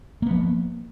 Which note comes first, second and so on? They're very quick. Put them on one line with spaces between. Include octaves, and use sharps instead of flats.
A#3 B3 F3